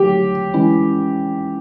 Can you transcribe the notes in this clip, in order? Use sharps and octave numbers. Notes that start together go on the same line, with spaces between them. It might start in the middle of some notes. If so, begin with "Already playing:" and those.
Already playing: D3 F#3 A3 G4
E3 G#3 C#4 E4